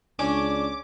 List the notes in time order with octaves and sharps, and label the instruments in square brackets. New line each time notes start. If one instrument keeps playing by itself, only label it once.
[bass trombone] C#2 [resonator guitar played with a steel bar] C#4 [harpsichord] D4 [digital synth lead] D6